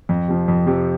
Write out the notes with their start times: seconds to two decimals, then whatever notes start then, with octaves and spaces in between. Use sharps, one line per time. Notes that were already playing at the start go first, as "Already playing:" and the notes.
0.09 F2
0.28 C3 F3
0.48 F2
0.67 C3 F3